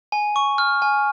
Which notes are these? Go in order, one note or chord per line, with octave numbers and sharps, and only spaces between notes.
G#5
C#6
F6
G#5